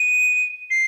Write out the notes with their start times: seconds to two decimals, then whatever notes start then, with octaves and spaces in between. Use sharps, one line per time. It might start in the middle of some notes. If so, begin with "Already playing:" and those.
Already playing: D#7
0.70 C7